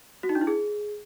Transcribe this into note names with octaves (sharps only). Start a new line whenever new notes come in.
F#4
D#4
D4
E4
G#4